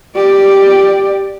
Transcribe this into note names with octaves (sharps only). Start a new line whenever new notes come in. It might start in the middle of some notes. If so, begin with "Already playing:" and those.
G4 D5